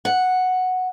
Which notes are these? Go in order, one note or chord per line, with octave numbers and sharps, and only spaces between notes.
F#5